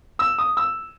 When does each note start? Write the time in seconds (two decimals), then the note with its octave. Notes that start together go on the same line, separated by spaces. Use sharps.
0.19 E6
0.38 D#6
0.57 E6